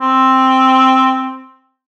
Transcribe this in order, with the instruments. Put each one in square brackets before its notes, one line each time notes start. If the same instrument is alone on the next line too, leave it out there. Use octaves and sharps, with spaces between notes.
[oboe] C4